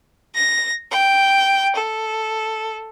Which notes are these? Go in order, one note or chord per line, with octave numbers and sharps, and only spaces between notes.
A#6
G5
A4